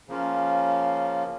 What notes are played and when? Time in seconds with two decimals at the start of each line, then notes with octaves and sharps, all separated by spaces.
0.08 C#3 F3 A#3 C#4 F4